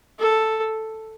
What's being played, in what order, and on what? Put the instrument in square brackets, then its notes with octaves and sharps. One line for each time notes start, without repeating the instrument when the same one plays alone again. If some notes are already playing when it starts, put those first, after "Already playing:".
[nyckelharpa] A4